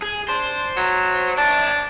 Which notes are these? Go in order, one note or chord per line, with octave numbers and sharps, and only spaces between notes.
G#4
D4 C5
F#3
D4 C#5 A5